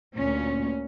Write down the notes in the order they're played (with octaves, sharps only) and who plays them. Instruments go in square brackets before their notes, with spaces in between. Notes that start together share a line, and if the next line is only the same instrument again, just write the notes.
[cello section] D2 A#2 C#4